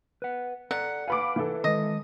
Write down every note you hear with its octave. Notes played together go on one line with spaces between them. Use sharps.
B4 F#5
A4 D5 F#5 A#5
B4 F5 G#5 B5 D6
E3 A4
D#3 G#3 D#5